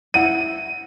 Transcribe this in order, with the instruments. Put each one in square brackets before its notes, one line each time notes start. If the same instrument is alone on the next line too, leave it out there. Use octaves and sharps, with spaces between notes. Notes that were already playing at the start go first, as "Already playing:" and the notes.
[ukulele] E4 F#5 [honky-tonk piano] D#7